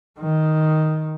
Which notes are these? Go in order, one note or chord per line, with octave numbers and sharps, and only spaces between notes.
D#3